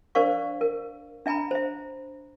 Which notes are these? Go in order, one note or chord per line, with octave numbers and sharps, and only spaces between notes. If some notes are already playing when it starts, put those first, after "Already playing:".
D4 A#4 C5 D5 F5 C#6
A#4
D4 E5 G#5 A#5 B5
C5 E5